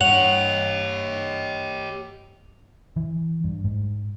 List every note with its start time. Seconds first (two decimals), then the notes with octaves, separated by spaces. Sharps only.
0.01 G2 G4 C#5 F#5 F7
2.96 E3
3.44 G2
3.64 G#2